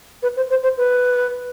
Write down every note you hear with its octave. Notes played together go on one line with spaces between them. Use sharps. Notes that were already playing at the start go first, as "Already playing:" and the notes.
B4
C5
C5
C5
B4